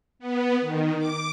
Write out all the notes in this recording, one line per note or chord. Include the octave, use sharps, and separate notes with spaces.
B3
D#3
D6